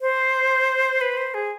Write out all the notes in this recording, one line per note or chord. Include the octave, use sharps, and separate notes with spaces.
C5
B4
C5
G#4